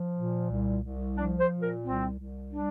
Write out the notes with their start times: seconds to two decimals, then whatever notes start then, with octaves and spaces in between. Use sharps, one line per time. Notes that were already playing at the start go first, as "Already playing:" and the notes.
Already playing: F3
0.16 A#2
0.50 C2
0.83 C2
1.16 F3 D4
1.39 C5
1.50 A#2
1.61 A#4
1.84 C2 C4
2.18 C2
2.51 G3 D4